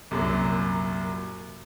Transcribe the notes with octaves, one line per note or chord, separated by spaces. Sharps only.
C2 F#2 A#2 F#3